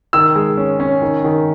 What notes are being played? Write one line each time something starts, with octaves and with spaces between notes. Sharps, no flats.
D#3 E6
G#3
C#4
C#4
D#3
D#3